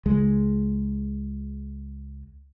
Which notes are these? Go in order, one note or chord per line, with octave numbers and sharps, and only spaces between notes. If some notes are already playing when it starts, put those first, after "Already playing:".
C#2 G#3